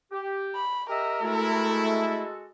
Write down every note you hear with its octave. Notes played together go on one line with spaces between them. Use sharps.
G4
B5
G4 A#4 D#5 E5
G#3 A3 E4 F#4 A4